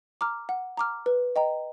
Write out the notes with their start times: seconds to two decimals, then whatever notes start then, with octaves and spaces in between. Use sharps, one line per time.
0.21 A#5 D6 F6
0.49 F#5
0.77 A#5 D6 F6
1.06 B4
1.36 D#5 G5 A#5